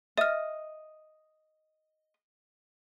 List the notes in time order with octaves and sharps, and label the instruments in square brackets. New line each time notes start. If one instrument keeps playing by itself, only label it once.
[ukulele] D#5 [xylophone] E5 F6